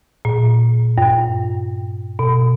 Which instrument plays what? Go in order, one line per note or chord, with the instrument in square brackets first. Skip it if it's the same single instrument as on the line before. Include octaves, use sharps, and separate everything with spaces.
[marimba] A#2
G2
B2